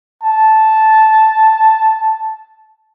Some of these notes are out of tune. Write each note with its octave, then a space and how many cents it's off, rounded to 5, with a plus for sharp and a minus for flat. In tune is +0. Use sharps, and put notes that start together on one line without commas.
A5 -5